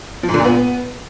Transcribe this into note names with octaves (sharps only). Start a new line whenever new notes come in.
F3
G#2
D3
A#2
B3